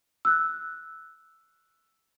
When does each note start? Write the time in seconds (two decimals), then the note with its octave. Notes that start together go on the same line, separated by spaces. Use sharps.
0.25 E6 F#6